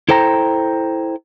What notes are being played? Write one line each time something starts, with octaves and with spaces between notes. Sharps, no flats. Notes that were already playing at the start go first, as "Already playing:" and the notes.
E4 A4 C5 G5 A#5